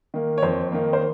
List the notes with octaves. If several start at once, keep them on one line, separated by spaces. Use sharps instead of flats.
D#3 A#3
C#5
F2 C5
D#3 A#3
C5